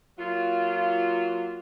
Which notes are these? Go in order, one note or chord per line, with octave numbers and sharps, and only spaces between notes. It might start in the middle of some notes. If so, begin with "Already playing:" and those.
F#3 A#3 F4